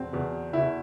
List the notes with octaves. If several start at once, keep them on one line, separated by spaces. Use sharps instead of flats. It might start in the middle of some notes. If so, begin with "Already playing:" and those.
Already playing: E2 B2 C4
E2 B2
E2 B2 E4